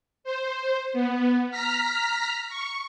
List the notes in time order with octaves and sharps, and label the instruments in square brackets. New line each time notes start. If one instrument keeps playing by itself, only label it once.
[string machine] C5
B3
A#5 F6 B6
C#6